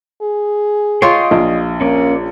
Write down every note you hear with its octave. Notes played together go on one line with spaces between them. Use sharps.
G#4
F4 C#5 D#5 G5 C6
A#1
A#3 C#4 D5